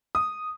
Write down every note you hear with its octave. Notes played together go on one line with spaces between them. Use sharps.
D#6